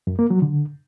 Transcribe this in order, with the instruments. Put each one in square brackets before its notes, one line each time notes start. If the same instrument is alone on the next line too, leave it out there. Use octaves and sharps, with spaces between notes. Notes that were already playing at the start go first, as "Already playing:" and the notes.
[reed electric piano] F#2
A#3
F#3
D3